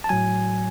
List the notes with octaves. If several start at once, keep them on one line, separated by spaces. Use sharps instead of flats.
A5
A2 F#3 G#5